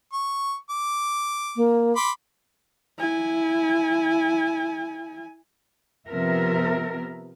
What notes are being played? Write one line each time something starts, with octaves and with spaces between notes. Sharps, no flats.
C#6
D6
A#3
B5 C6 D6
E4 G#5
C3 F3 B3 A#4 E5